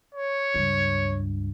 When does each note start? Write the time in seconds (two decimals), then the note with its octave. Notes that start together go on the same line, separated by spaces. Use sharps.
0.15 C#5
0.54 C#2 G2